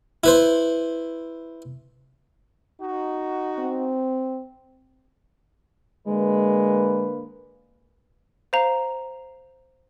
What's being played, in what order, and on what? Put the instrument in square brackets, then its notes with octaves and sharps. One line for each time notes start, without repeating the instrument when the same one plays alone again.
[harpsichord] E4 B4 C5
[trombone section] D#4 F#4
[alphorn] C4
[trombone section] D3 A#3 B4 [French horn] G#3
[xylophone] C5 F5 A#5